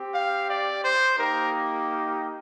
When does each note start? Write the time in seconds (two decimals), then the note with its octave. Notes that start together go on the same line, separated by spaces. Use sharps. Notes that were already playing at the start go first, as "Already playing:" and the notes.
Already playing: C4 G4
0.13 F5
0.48 D5
0.82 C5
1.17 A#3 D#4 G4 A#4